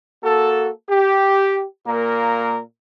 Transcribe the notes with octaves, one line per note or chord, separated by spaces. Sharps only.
A#3 F#4 A4
G4
A#2 A#3 A#4